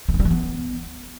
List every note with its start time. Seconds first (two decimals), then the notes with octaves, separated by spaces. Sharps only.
0.09 G3
0.14 G#3
0.20 G3
0.25 E3
0.31 B3